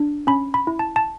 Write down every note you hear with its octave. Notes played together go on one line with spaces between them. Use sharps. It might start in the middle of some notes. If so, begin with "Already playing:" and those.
Already playing: D4
C#4 B5
B5
E4
A5
A5